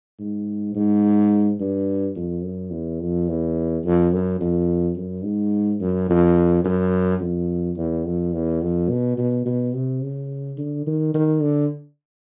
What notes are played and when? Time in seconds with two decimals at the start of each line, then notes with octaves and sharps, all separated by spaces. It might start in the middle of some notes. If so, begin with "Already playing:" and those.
0.20 G#2
0.75 G#2
1.60 G2
2.16 F2
2.44 F#2
2.71 E2
3.00 F2
3.28 E2
3.85 F2
4.12 F#2
4.40 F2
4.96 F#2
5.24 G#2
5.81 F#2
6.09 F2
6.64 F#2
7.21 F2
7.77 E2
8.05 F2
8.33 E2
8.62 F2
8.89 B2
9.17 B2
9.46 B2
9.74 C3
10.02 C#3
10.58 D3
10.86 D#3
11.14 D#3
11.42 D3